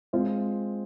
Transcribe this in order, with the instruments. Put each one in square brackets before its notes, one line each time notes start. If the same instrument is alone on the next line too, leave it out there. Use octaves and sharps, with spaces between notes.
[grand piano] G#3 C4 F4 C5